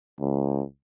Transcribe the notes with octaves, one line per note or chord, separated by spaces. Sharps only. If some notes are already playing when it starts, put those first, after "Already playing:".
C#2